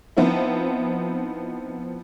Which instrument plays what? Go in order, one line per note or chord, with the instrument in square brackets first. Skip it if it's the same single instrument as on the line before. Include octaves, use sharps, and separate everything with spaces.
[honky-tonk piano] F3 B3 C4 D#4 E4